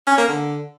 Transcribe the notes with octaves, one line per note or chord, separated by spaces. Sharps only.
C#4
A#3
D3